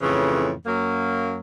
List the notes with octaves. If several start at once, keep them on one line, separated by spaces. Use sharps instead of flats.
F2 A2 C#3 E3
F#2 F#3 A#3